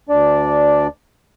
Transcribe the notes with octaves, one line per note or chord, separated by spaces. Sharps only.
D2 D4 D5